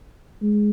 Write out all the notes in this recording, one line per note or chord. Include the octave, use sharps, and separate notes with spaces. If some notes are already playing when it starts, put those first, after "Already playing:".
G#3